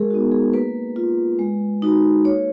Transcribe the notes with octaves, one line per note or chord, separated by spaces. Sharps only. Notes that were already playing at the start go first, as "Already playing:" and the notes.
Already playing: G#3 G#4 A#4
B3 D#4 F#4
G#4
A#3 B4
F4
G#3
D#4 F#4
A#3 C#5